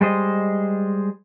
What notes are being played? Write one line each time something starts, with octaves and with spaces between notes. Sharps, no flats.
G3 G#3 C5 D#5